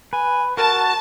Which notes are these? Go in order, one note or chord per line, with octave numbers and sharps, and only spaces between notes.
B4 G#5
F#4 A#4 A5